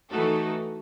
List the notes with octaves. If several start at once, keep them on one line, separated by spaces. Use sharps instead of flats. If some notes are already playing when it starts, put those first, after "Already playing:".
E3 A3 D#4 F#4 A4